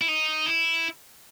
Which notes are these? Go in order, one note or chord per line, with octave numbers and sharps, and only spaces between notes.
E4
D#4
E4